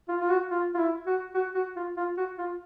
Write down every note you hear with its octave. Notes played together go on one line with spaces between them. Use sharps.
F4
F4
F#4
F4
F4
E4
F#4
F#4
F#4
F4
F4
F#4
F4